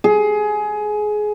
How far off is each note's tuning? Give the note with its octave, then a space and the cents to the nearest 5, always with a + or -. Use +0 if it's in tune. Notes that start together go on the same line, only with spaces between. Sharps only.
G#4 +20